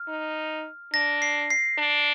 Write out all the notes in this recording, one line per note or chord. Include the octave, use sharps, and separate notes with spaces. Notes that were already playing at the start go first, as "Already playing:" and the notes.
Already playing: F6
D#4
D4 A#6
C7
C7
D4